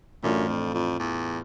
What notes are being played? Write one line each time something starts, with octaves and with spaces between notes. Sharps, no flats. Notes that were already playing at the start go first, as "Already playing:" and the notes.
F#2 A2 E3 A3 D4 F4
F2
F2
E2